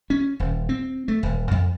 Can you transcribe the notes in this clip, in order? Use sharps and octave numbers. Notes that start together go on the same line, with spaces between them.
C#4
D#1
C4
A3
D#1
F2